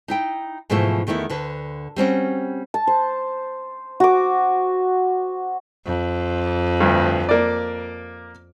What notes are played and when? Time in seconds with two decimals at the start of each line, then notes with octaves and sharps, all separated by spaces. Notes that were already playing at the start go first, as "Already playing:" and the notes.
0.08 D#4 E4 G5
0.70 G#2 B2 E3 F3 A3 E4
1.07 E2 D#3 A3 B3 E4
1.30 D2 D3 B4
1.96 G3 C4 C#4 F#4
2.74 A5
2.87 C5
4.00 F#4 D6
5.86 F2
6.80 D2 G2
7.29 A#3 D5